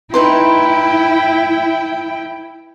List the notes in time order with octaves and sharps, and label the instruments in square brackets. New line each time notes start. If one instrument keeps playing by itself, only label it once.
[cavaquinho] D#4 B4 C6 [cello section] E4 [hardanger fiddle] G5